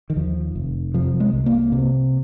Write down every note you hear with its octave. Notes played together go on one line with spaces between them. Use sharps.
D#3
D#2 F3
F1
C3 F3
G#3
C2
A#3
C3